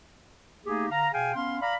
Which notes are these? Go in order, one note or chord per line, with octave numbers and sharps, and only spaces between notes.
A3 A#3 D#4 G4 G#4
D3 F5 A#5
B2 G#4 F5 G5 G#5
B3 C#4 F5 C6
D5 F5 A#5 B5